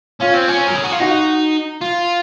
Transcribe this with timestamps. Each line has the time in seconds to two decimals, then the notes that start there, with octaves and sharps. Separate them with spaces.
0.21 C#4 F4
0.34 C4
0.49 C#4
0.68 A#4
0.76 G#4
0.84 F#4
0.92 F4
1.00 D#4 F#4
1.81 F4